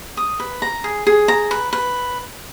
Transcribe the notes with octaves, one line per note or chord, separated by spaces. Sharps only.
D#6
B4
A#5
G#4
G#4
A#5
B4
B4